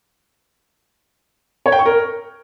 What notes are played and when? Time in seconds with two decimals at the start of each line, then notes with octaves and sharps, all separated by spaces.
1.66 C#5
1.72 G5
1.79 C#6
1.86 A#4